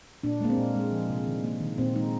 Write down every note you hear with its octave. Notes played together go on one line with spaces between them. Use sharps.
A#2 D4
G#3 A#3
C4
A#2
G#3
F3
C3
D#3
A#3
D#3
A#2 C4
G#3 D#4